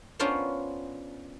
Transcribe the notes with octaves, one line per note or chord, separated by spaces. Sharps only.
B3 C#4 D4 F4 A#4 C5